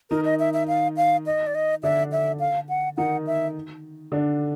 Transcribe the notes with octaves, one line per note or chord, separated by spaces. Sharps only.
D#3 D#4 A#4
D#5
E5
E5
F5
F5
D#5
D5
D#5
D3 D4 E5
E5
F5
F#5
D#3 D#4 F#5
E5
D3 D4